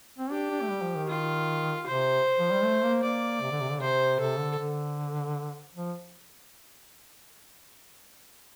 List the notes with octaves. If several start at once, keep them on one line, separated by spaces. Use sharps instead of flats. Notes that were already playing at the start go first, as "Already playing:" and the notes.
C4
D4 G4
D4
A3
G3
F3
D#3
F4
C3 C5
F3
G3
A3
A#3
A#3 D5
C3
D3
C3
D3
C3 C5
C3 A4
D3
D3
F3